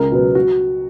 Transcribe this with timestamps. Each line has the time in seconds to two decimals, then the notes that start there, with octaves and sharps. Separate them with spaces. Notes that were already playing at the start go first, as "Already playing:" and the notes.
Already playing: C#2 A#4
0.12 B2 F#3 B3
0.35 F#4